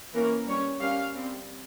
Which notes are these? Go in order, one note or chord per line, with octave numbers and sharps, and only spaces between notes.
E3 A#3 C#4 A#4
G3 C#4 C#5
G3 A#3 C#4 F5
G3 C4